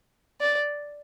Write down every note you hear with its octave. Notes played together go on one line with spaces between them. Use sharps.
D5